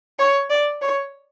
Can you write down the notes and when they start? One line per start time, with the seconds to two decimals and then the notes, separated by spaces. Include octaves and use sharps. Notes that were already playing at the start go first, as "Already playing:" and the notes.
0.19 C#5
0.50 D5
0.81 C#5